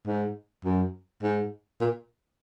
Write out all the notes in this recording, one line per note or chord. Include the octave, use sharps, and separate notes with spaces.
G#2
F#2
G#2
A#2